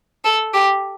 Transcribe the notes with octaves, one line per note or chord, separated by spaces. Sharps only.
A4
G4